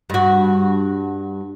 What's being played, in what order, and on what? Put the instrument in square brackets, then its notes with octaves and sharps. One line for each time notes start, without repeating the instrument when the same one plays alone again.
[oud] G2 F#4